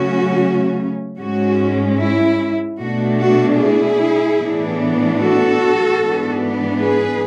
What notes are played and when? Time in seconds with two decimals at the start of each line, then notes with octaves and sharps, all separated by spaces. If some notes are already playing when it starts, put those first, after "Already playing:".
Already playing: C#3 F#3 A3 C#4 F#4
1.19 G#2 G#3 C#4 F#4
1.99 E4
2.80 B2 A3 D4 F#4
3.20 F#4
3.59 E4 G#4
4.40 A2 E3 B3 D4
5.20 F#4 A4
6.00 G#2 E3 B3 D4
6.80 G#4 B4